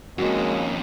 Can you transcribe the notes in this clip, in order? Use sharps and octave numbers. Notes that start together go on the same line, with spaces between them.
F2 D#3 G#3 A#3 C#4 F#4